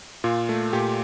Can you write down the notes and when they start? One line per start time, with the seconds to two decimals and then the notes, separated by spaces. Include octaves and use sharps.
0.24 A#2 F4
0.49 A3
0.73 A#2 G4